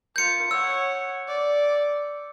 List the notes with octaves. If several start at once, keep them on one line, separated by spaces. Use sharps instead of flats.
F4 A#4 G6 C#7
C#5 F#5 E6
D5